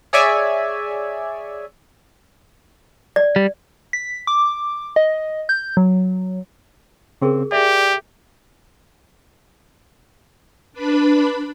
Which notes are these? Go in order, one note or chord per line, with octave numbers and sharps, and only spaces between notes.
G#4 C#5 D5 E5 G#5
D5
G3
B6
D6
D#5
G6
F#3
C#3 C4 G4 G#4 A#4
G4 G#4 D5 E5
D4 B4 B5